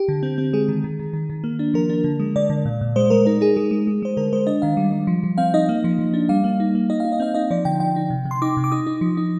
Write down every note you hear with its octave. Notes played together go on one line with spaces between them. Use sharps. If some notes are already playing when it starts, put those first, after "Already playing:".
Already playing: G4
D3
C4
C4
G#3 G#4
D#3
D#3
D#3
D#3
D#3
A#3
D4
F3 A#4
D4
D3
G#3
D3 D5
D3
A#2
A#2
G#3 C5
G#3 A#4
D#4 A#4
D#4 G#4
G#3 G#4
G#3
G#3
G#3 C5
D3 A#4
G#3 C5
D4 D#5
D#3 F5
G3
G3
F3
F3
C4 F5
D#4 D#5
A#3
F3
F3
D4
G3 F5
A#3
D#4
A#3
D#4 D#5
D#4 F5
D#5
C4 F5
D#4 D#5
F3 D5
D3 G5
F3 G5
D#4
C3
C3
C6
D#4 D6
C3
D6
D#4 D#6
D#4
F3
D#4